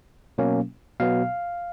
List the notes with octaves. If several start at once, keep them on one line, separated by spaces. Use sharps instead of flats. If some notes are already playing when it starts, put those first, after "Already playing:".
B2 F#3 A#3 C#4
B2 F#3 B3 F5